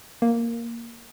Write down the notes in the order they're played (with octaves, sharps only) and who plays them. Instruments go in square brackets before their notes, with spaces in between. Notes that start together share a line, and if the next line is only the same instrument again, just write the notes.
[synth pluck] A#3